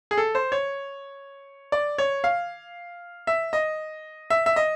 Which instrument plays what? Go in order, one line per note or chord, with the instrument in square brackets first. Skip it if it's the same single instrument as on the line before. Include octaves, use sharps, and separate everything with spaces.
[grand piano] G#4
A4
C5
C#5
D5
C#5
F5
E5
D#5
E5
E5
D#5